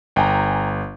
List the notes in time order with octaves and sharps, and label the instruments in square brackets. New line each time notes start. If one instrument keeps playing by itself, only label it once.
[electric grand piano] G1 [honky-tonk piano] G5 G#5 A#5